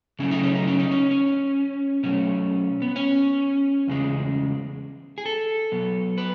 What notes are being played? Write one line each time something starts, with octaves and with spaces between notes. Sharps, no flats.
C#3 F#3 A3 C#4
D#4
C#4
D#4
C#4
D#4
C#4
C#4
B2 F#3 A3 C#4
B3
C#4
E2 C#3 G#3
G#4
A4
B2 F#3 B3
B4